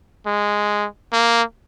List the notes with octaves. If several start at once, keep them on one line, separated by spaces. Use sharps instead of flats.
G#3
A#3